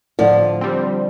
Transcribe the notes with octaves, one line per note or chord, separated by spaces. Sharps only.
A2 D3 F3
G3 C4